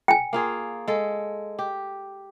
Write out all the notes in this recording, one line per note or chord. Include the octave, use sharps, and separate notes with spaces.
G5 G#5
A#3 F4 G#4
G#3 A4
G4